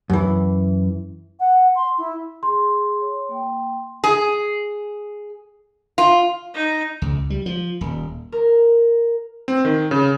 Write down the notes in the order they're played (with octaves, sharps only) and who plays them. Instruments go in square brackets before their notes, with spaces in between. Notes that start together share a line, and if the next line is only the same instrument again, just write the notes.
[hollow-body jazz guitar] F#2 E3
[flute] F#5
C6
E4
[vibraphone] G#4 [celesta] C6
[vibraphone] C#5
A#3 G5
[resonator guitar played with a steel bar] G#4
F4
[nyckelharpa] D#4
[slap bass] C#2
G3
F3
D#1
[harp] A#4
[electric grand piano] C4
D#3
C#3